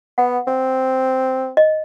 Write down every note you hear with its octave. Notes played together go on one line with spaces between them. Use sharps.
B3 F#5
C4
D#5